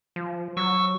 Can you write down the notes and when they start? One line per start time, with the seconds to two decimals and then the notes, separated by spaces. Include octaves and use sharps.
0.16 F3
0.57 F#3 C#6 E6